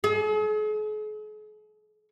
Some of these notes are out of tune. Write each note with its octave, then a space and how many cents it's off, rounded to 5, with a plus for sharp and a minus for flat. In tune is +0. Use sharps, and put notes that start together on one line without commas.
G#4 +45